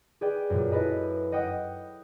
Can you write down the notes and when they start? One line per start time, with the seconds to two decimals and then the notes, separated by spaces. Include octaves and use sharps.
0.21 G#4 B4 D5 G5
0.50 F#2 A#2
0.71 E4 A4 B4 D#5
1.32 D#5 F#5 G5 D#6